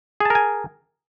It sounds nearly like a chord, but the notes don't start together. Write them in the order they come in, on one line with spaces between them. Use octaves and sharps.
G#4 A5 A#4 G#5